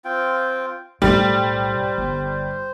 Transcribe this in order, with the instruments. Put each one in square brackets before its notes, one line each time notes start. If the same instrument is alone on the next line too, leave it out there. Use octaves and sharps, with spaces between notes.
[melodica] C4 F4 G5
[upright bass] B1 A2 [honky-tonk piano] G3 [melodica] C5
[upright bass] G1